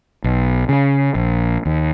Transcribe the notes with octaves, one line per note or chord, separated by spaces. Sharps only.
B1
C#3
A#1
D#2